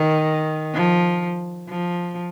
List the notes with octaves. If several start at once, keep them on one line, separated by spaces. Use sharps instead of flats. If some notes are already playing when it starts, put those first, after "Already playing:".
Already playing: D#3
F3
F3